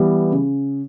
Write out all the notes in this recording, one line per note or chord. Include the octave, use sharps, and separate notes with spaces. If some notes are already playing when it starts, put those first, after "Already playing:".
Already playing: E3 G3 B3
C#3